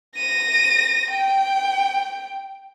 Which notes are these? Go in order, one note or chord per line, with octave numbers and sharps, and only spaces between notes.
A#6 D#7
G5